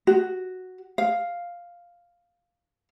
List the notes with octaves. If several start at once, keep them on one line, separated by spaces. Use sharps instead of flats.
F#4
F5